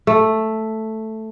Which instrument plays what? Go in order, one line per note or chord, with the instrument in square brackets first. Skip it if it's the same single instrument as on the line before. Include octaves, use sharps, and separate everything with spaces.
[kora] A3